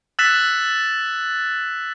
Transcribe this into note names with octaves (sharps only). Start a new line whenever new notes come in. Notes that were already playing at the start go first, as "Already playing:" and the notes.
E6 F#6 A6 B6 E7